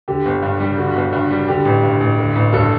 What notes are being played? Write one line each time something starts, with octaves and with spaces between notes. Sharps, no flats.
D3 G4
G1
G2
G3
D3 F#4
G1
G2
G3
D3 G4
A1
G2
A1
D3
A1
G2 A4